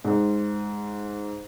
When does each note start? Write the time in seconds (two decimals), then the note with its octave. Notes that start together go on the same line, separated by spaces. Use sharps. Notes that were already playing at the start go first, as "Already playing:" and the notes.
0.05 G#2